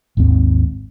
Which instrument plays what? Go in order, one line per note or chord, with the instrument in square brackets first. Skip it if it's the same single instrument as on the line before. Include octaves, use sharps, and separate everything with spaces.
[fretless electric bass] G#1 D#2 G#2 C4